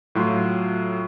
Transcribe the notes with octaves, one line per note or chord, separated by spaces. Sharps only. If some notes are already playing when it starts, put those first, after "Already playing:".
A2 F#3 F4